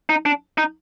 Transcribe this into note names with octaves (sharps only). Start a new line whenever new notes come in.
D#4
D4
D#4